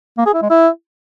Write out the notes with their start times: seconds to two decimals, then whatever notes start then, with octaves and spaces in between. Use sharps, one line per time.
0.18 A#3
0.26 G#4
0.34 E4
0.42 G#3
0.50 E4